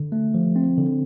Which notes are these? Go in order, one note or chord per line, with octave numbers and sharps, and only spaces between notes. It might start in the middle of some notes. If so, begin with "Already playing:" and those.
Already playing: D3
A3
F3
C4
D3